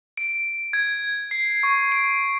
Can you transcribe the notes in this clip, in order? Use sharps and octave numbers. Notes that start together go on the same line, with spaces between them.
D7
G#6
C7
C#6
D7